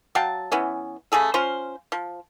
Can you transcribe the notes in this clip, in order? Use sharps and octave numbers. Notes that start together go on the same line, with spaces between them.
F#3 F5 G5 A5
E3 B3 C#4
C#3 A3 G#4 A4
C#4 F4 C5
F3